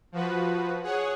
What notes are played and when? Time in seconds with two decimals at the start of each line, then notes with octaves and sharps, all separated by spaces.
0.12 F3 F#4 B4
0.84 G#4 C#5 F#5